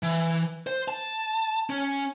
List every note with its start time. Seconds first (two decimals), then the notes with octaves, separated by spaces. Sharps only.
0.03 E3
0.67 C5
0.88 A5
1.70 C#4